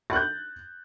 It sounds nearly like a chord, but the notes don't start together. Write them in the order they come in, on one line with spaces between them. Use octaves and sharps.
A6 F#6 G6